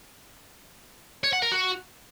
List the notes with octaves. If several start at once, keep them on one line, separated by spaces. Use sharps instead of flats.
C#5
F#5
A#4
F#4